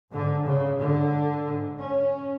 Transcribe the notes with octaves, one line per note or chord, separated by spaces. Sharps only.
G#2 D3
C#3
G#2 D3
G#2
C#4